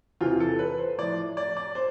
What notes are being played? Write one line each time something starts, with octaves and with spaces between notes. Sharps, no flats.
E2 C3 E3 F4
A4
B4
C5
A2 F3 D5
D5
D5
C5